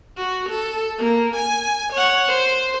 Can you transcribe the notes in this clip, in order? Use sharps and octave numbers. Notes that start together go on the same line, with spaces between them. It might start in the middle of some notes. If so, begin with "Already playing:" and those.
F#4
A4
A#3
G#5
C#5 F#5
C5